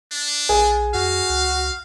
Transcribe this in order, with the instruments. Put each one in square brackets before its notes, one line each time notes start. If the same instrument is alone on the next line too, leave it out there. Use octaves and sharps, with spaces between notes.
[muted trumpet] D4
[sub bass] A#1 [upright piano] G#4
[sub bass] F2 [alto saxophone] F#4 [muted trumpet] F5
[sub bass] C#2